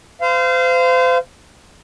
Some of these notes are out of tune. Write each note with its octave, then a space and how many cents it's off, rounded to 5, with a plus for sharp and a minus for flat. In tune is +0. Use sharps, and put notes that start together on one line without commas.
C5 -35 F5 -20